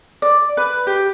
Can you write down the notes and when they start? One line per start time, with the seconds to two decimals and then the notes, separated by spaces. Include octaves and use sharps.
0.22 D5
0.57 B4
0.87 G4